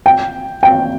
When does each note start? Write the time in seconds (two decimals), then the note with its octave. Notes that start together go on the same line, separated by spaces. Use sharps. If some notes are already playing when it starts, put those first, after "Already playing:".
0.06 G5
0.63 G5